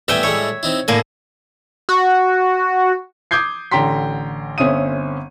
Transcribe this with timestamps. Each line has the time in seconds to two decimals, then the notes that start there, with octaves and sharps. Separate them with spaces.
0.08 A2 G3 B3 E5 G5 G#5
0.23 A2 G3 G#3 C#5
0.63 C4 D#4 E4
0.88 A2 D3 A#3 G#5
1.89 F#4
3.31 D6 D#6 G6 G#6 C7
3.72 A1 D3 G5 A#5 C6 B6
4.58 G1 C4 C#4 E5 D#6 D#7